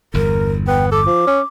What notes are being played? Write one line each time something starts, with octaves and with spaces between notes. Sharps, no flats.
G1 E2 A#4
B3 G5
A4 D6
F3
C#4